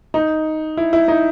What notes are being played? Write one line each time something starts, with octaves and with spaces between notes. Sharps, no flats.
D#4
E4
E4
D#4